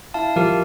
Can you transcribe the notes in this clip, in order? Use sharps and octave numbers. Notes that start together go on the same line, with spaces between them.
E4 F5 A5
F3 G4 A#4